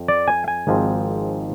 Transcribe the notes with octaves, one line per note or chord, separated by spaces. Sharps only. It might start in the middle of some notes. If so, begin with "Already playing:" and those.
Already playing: F2
D5
G#5
G#5
G#1 G#2 F3 G#3 C4